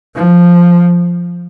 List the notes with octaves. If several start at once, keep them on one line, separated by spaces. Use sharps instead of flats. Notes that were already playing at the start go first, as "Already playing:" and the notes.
F3